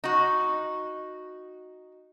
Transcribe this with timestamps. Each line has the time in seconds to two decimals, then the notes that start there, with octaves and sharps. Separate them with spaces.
0.04 D#4 F#4